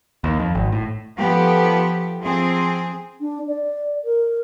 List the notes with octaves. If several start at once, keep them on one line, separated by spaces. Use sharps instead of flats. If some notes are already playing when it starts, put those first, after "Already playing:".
D#2
F2
G#1
A2
F3 B3 G4 A4
F3 C4 G#4
D4
D5
A#4